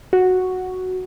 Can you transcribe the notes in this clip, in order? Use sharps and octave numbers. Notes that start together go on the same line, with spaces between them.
F#4